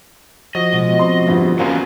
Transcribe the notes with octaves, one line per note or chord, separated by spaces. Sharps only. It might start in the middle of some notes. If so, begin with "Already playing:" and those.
F3 F#4 D#5
B2 G#3
C4 C6
A#1 F2 G3 B3 E4
E3 F#3 A#3 C#4 F#4 C5 F5